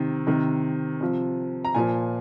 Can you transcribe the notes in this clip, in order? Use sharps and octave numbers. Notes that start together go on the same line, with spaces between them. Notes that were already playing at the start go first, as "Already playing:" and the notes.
Already playing: C3 D#3
C3 D#3
C3 F3
A#5
A#2 F3 G#5